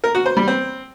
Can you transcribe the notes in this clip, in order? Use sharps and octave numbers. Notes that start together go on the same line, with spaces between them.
A#4
F#4
C5
G3
C4